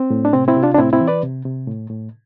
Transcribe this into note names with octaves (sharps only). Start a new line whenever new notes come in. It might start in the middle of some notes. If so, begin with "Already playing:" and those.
Already playing: C4
A2
D4
C3 C4
C4 E4
C3
D4 F4
D4
A2 C4 E4
C4 E4
E3
B4 D5
C3
C3
A2
A2